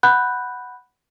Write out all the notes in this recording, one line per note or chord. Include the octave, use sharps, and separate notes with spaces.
F#5 B5 F#6 G6